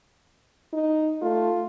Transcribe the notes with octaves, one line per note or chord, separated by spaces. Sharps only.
D#4
A3 F4